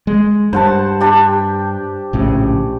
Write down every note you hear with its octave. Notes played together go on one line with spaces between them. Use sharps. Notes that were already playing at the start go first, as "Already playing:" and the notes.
G#3
G2 C5 F#5 A5
D4 G4
A#1 A2 C#3